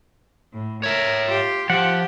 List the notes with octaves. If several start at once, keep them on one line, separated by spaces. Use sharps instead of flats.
A2
A#4 C#5 E5
F4 G4
F3 G4 F#5